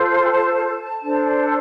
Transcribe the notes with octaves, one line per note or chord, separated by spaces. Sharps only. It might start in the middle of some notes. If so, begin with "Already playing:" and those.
Already playing: F4 A4 C5
C6
G#5
A5
D4 A4 C5